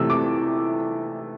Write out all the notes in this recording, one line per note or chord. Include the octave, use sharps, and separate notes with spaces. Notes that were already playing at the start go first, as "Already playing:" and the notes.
Already playing: C3 E3 A3 E6
D6